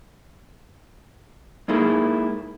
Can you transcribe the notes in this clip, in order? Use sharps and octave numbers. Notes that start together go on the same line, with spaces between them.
G#3 A#3 D#4 E4 G#4 A4